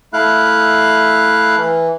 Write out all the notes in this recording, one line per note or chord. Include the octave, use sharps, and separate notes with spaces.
A3 E4 F5 F#6
E3